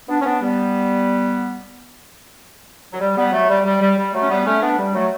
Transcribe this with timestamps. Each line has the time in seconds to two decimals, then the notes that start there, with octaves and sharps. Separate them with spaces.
0.09 B3 D4
0.20 C#4
0.25 B3 D4
0.41 G3 B3
2.93 F#3
3.00 G3
3.17 G3 B3
3.32 F#3 A3
3.49 G3
3.64 G3
3.81 G3
3.97 G3
4.13 F#3 A3
4.22 C#4
4.30 G3 B3
4.46 A3 C#4
4.62 B3 D4
4.78 G3
4.94 F#3 A3